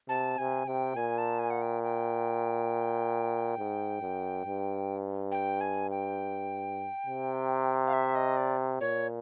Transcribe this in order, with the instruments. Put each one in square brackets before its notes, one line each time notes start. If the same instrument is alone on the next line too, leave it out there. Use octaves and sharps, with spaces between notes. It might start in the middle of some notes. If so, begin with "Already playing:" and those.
[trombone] C3 [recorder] A5
[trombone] C3 [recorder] G#5
[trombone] C3 [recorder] G5
[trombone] A#2 [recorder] G#5
[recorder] A5
G#5
F#5
G5
G5
[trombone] G#2
F#2
G2
[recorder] G5
G#5
G5
[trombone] C3
[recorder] F5
E5
D#5
D5
[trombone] A#2 [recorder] C#5